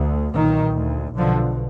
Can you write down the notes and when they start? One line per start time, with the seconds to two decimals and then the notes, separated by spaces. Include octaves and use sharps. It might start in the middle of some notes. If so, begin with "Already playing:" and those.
Already playing: D2
0.34 B1 A#2 D#3
0.76 D2
1.17 B1 B2 D3 F3